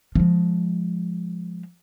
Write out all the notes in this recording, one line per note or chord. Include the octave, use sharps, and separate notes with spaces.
F3 G#3